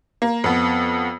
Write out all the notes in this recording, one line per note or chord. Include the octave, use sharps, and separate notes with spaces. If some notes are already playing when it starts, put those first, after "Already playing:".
A#3
F2 B3